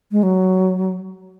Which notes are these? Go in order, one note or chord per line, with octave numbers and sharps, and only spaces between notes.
G#3
F#3